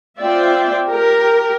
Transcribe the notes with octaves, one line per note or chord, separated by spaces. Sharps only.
C4 F4 D5 E5 G5
G4 A#4